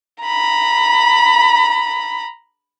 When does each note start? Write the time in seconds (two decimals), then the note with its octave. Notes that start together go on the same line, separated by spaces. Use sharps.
0.23 A#5 B5